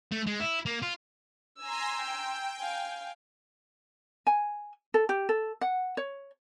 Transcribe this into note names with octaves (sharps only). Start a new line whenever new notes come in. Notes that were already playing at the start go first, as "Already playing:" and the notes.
A3
G#3
E4
A#3
F4
G#5 A#5 C6 E6
G5
F5 G#5
G#5
A4
G4
A4
F#5
C#5